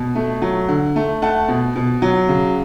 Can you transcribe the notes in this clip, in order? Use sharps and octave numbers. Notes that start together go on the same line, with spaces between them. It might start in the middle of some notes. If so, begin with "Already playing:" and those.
Already playing: B2
A3
F#3
D3
A3
A3 F#5 A5
B2
B2
F#3
C#3